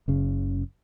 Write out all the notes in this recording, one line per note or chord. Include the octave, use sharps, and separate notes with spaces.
F#1 C#3